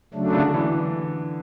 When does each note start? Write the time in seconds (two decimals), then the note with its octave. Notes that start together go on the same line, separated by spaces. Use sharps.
0.14 C#3 F#3 A3 D4
0.34 D3
0.54 E3